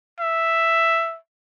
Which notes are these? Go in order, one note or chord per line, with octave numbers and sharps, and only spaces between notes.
E5